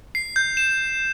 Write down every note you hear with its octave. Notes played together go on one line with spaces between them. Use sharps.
C7
G6
E7